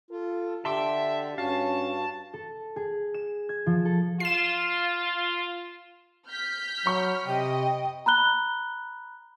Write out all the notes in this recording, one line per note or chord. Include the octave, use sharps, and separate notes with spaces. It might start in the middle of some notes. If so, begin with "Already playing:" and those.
F4 A4
D3 G4 E5 A5 C6 D6
G2 C#4 F#4 F5 A5
A4
G#4
E7
G#6
F3
A4
F4 C7 E7
F6 G6 B6
F#3 B5 C#6
C3 D#5 G5
A#5 B5 F#6 G7